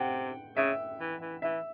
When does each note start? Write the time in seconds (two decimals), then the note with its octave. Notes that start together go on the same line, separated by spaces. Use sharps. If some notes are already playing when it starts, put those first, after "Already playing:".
Already playing: C3 F#5 G5
0.56 C#3 E5
1.00 E3
1.21 E3
1.42 E3 E5